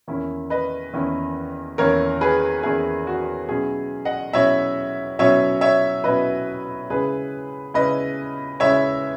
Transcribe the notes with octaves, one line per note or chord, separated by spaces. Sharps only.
E2 D#3 A#3 C#4 E4
B4 D#5
E2 D#3 A#3 C#4 E4
E2 D#3 A#3 C#4 E4 A#4 C#5
G#4 B4
E2 D#3 A#3 C#4 E4 G#4
F#4
B2 F#3 C#4 E4 G#4
D#5 F#5
B2 F#3 C#4 E4 C#5 E5
B2 F#3 C#4 E4 C#5 E5
C#5 E5
B2 F#3 C#4 E4 B4 D#5
C#3 G#3 C#4 E4 G#4 B4
C#3 G#3 C#4 E4 B4 D#5
C#3 G#3 C#4 E4 C#5 E5